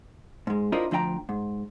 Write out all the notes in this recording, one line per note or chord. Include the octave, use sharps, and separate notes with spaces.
G#2 G#3
D4 E4 F4 A#4 C5 D#5
D2 F3 D4 D#5 G5 A#5
G#2